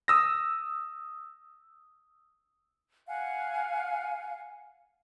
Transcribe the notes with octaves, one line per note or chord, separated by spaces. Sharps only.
D#6 E6 A#6
F5 F#5 G#5